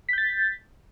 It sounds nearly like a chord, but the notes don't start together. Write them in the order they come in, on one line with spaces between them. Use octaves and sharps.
B6 G6 A6